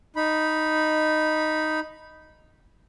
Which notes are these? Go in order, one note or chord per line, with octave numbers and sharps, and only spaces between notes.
D#4 B5